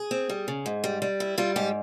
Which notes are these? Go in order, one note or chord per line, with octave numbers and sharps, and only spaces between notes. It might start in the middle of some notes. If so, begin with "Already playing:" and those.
Already playing: G#4
C4
G3
C#3
G#2
G3
G3
E4
G3 F4
G#2 G4